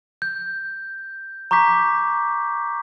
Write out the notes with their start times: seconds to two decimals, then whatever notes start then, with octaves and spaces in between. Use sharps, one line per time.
0.22 G6
1.51 A#5 C#6 D6 G6 B6